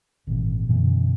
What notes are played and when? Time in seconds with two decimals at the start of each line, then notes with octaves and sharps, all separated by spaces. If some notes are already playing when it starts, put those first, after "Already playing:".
0.27 G#1 A#2 E3
0.68 F#2 B2 D3 E3